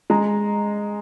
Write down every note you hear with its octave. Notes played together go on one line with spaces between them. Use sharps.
G#3 A#5